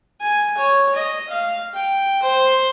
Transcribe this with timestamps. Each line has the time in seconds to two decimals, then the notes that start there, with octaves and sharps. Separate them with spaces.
0.21 G#5
0.57 C#5
0.95 D#5
1.29 F5
1.74 G5
2.22 C5